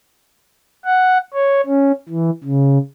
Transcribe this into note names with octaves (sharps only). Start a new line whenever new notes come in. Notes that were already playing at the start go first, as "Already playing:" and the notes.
F#5
C#5
C#4
E3
C#3